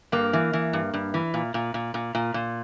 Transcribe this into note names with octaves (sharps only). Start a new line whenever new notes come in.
G2 A#3
E3
E3
G2
G2
E3
A#2
A#2
A#2
A#2
A#2
A#2